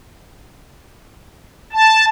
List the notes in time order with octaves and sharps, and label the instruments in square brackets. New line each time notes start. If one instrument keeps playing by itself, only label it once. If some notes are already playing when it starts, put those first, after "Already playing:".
[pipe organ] A5